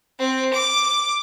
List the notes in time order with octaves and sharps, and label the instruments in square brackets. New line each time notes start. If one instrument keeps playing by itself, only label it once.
[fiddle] C4
D6